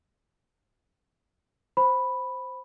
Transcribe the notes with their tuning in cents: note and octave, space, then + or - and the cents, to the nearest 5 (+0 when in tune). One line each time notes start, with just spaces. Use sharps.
C5 +0 B5 +0